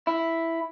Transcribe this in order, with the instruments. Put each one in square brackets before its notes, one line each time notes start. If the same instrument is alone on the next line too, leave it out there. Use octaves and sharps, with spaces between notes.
[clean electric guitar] E4